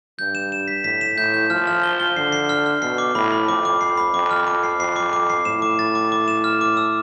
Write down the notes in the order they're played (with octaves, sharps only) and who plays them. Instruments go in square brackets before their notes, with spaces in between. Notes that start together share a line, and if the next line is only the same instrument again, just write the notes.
[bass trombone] G2 [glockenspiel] G6
[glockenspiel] E7
E7
B6
[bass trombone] A2 [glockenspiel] B6
[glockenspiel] E7
[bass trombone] A2 [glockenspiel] G6
[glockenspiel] G6
[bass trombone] F3 [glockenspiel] F6
[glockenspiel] F6
G7
G7
[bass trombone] D3 [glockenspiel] C7
[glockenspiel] C7
F6
F6
[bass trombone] B2 [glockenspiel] C7
[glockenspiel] D6
[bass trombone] A2 [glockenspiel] B5
[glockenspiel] B5
[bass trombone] F2 [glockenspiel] D6
[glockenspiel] D6
C7
B5
[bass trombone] F2 [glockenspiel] D6
[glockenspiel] F6
D6
C7
[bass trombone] F2 [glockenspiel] C7
[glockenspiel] D6
D6
C7
[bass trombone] A2 [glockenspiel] E7
[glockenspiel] D6
A6
D6
D6
E7
F6
D6
E6